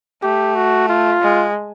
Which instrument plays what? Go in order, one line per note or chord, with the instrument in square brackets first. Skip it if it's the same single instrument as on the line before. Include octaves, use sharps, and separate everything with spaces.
[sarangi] A3 [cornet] G4
[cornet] F#4
F4
[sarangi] G#3